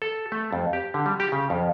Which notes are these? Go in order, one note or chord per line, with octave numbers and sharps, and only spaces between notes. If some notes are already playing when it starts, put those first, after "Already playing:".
A4
A3
F2
G4
D3
G3
G4
C#3
F2